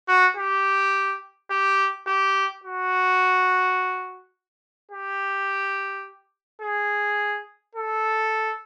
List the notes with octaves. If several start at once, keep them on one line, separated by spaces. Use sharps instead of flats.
F#4
G4
G4
G4
F#4
G4
G#4
A4